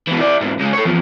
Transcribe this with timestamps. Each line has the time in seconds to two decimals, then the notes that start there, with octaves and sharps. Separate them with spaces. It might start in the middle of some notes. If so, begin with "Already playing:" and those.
0.07 B2 E3
0.19 E4 D5
0.41 E2 G#2
0.60 C#3 G#3
0.73 A4 C#5
0.85 E2 F3